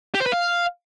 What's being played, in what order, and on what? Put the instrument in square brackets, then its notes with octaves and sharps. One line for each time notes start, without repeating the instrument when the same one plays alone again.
[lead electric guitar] G4
C5
B4
F5